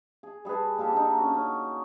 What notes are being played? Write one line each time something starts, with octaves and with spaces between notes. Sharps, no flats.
G#4
G3 G#4 A4 B4
A#2 G4 A4
D4 D#4
C#4 F#4
C#4